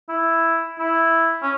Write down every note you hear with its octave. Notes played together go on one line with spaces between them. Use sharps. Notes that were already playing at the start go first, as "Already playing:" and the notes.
E4
E4
C#4